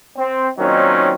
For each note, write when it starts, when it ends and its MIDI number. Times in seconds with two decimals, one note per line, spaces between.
0.17 0.48 60
0.58 1.14 46
0.58 1.14 51
0.58 1.14 54
0.58 1.14 60
0.58 1.14 61
0.58 1.14 63